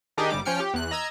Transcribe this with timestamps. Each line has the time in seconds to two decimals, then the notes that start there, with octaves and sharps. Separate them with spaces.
0.17 D#3 D4 D#4 G4 G#4 D#5
0.30 G1 G3 D6
0.45 F3 C#4 G5 F6 C#7
0.60 G4
0.74 E2 F#6
0.91 D#5 A#5 E6 G#6